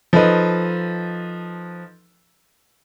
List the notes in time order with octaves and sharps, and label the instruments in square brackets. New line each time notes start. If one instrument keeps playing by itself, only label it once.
[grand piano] F3 D#4 A4 B4 D#5